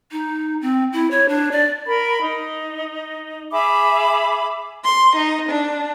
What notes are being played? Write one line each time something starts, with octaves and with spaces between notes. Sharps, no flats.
D#4
C4
E4
C#5
D4
D5
A#4 B5
D#4
G#4 E5 B5 D6
C6
D#4
D4